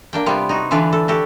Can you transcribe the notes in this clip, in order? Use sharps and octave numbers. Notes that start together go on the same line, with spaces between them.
A#3 D4 G5
C3 G3 B3 F4
D#4 F#4
D3 E3 D4 F4 B4
A4
F#4 G4 A4